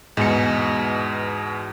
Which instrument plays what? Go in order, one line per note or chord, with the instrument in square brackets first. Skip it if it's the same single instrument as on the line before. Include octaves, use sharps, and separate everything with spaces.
[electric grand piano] E2 B2 [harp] G#2 C#7